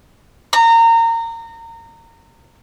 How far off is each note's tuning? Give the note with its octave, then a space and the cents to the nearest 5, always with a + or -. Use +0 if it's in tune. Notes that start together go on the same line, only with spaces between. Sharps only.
A#5 -25